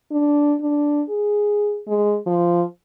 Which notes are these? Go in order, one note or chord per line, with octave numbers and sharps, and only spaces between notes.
D4
D4
G#4
G#3
F3